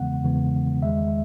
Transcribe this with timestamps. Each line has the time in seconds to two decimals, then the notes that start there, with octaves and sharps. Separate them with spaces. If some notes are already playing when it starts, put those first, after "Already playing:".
Already playing: E2 C#3 E3 G#3 B3 F#5
0.23 E2 C#3 E3 G#3 B3
0.82 E2 D#3 G#3 E5